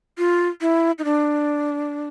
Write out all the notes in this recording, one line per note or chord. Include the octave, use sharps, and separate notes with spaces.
F4
E4
D#4
D4